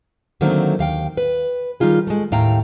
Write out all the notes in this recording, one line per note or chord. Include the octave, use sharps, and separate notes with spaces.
D3 D#3 F#3 A3 A#3 C4
D#2 F5 G5
B4
D#3 G3 D#4 F4 G#4
G#3 A3
D#2 A2 F5 G5 A#5